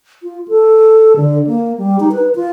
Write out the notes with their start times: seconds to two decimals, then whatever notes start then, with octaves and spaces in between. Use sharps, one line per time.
0.23 F4
0.48 A4
1.17 D3
1.47 A#3
1.78 G3
2.00 D#4
2.12 B4
2.35 F4